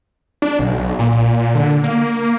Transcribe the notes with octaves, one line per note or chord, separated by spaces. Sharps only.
D4
B1
A#2
D3
A#3